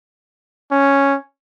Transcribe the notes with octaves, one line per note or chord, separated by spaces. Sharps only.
C#4